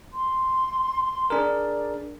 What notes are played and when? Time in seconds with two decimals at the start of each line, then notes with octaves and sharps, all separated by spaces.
0.13 C6
1.30 D4 G#4 A#4 D5